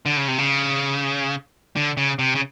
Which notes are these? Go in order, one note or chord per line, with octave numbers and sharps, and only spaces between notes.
D3
C#3
C3
C#3
D3
C#3
C3
C#3